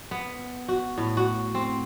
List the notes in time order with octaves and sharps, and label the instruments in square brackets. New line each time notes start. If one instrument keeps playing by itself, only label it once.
[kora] B3
F#4
A2
F#4
C4